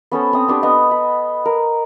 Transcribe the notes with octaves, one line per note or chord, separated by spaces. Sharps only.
B3 C#4 A4 C5
C4 D#6
B3 D4 G4
B3 D#5 F#5 D#6
B5
A#4